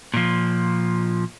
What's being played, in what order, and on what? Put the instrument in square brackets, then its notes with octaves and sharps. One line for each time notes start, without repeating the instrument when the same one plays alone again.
[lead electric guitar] A#2 F3